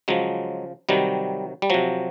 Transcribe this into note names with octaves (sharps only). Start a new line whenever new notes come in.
C#3 F3 F#3 G#3
C3 D#3 F#3 G3
G3
C3 F3 F#3